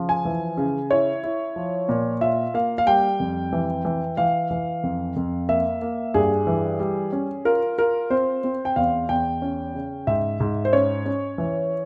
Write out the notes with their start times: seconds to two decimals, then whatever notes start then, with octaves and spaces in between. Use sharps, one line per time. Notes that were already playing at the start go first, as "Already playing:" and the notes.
Already playing: C#3 F3
0.09 G#5
0.25 E3
0.57 C#3
0.90 E4 C#5
1.23 E4
1.56 F3
1.89 A#2
2.21 F4 E5
2.54 A#3 F5
2.78 F5
2.87 G3 G5
3.20 F2
3.53 E3
3.85 E3
4.17 E3 F5
4.51 E3
4.83 F2
5.16 F2
5.49 A#3 E5
5.82 A#3
6.14 G2 G#4
6.47 E3
6.80 G3
7.13 C#4
7.45 F4 A#4
7.78 F4 A#4
8.10 C4 C5
8.44 C4
8.65 G5
8.76 E2 F5
9.09 E2 G5
9.42 C#4
9.75 C#3
10.07 G#2 E5
10.40 G#2
10.65 C5
10.73 C#4 C#5
11.05 C#4
11.38 E3